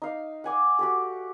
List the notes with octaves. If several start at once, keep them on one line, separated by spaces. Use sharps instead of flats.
D#4 F5
F#5 G#5 D6
F#4 G4 A4